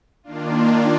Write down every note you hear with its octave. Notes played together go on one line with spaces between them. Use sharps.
D#3 A#3 D4 F4